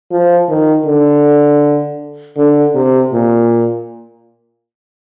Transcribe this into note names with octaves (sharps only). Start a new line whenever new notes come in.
F3
D#3
D3
D3
C3
A#2